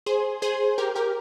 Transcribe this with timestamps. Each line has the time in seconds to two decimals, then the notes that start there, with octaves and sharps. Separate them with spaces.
0.06 G#4 C5
0.42 G#4 C5
0.78 G4 A#4
0.95 G4 A#4